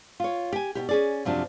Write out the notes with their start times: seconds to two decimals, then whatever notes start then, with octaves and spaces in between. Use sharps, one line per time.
0.20 F4 C#5
0.53 G4 G#5
0.75 B2 E3 G4
0.89 C#4 G#4 D5
1.25 F#2 C3 F3 D4